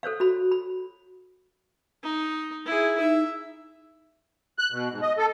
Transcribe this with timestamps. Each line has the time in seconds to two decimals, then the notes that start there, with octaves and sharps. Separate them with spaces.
0.03 A4 C5 C#5 F5
0.20 F#4 B5
0.52 B5
2.03 D#4
2.66 E4 G#4
3.00 D#4 E5
4.59 F#6
4.72 B2
4.90 G#2
5.02 D#5
5.18 A4